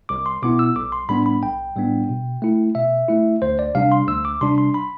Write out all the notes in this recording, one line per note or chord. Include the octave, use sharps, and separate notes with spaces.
C2 D6
C6
B2 B3 E4 D6
E6
B1 D6
C6
A2 G3 B3 D4 B5
B5
B1 G5
A2 G3 B3 D4
B2
A3 E4
B2 E5
A3 E4
D2 C5
D5
C3 G3 D4 F5
C6
D2 E6
D6
C3 G3 D4 C6
C6
B5